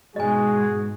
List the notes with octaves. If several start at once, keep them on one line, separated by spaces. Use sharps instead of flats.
G#2 B2 G#3 F#4 G#4 D#5 G#5